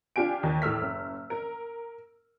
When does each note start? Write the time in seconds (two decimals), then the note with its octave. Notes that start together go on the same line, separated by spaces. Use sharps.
0.16 D4 F4 G4 G#5 D7
0.43 D#2
0.62 A2 E6 F6 B6
0.81 F#1
1.30 A#4